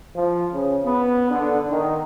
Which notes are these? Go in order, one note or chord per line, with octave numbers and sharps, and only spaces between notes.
F3
C#3
B3
D3
D#3